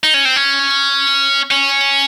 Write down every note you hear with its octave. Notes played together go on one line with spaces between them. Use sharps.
D#4
C#4
C4
C#4
C#4